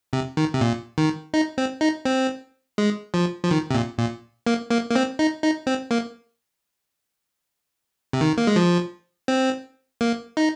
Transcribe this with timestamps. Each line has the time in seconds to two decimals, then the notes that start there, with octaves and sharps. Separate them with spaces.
0.13 C3
0.37 D#3
0.54 C3
0.61 A#2
0.98 D#3
1.34 D#4
1.58 C4
1.81 D#4
2.05 C4
2.78 G#3
3.14 F3
3.44 F3
3.51 D#3
3.71 C3
3.74 A#2
3.99 A#2
4.46 A#3
4.71 A#3
4.90 A#3
4.95 C4
5.19 D#4
5.43 D#4
5.67 C4
5.91 A#3
8.13 C3
8.21 D#3
8.37 A#3
8.47 G#3
8.56 F3
9.28 C4
10.01 A#3
10.37 D#4